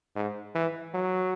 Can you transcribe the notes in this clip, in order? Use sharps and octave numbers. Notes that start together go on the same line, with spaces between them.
G#2
E3
F#3